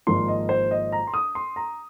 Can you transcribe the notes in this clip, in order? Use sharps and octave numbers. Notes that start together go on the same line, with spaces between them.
G#1 G#2 F3 A#3 F4 C6
D#5
C5
D#5
A#5
C6
D#6
C6
A#5